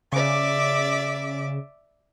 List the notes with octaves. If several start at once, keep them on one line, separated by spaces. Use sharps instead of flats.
C#3 D5 E5 D6